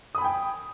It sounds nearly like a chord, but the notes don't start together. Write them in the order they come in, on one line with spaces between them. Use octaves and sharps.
D#6 B5 G#5 G5